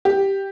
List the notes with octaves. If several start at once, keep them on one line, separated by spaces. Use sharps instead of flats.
G4